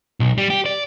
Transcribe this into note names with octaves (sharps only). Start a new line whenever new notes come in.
B1
G3
G4
D5